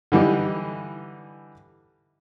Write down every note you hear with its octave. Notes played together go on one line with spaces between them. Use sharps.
D3 E3 G3 D#4